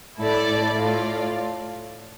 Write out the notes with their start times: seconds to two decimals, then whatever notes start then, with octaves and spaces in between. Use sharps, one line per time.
0.17 A2 E4 A4 D5
0.47 A2
0.74 A2 F4 A4 D5 F5